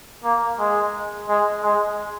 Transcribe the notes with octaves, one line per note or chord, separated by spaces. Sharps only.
A#3
G#3
G#3
G#3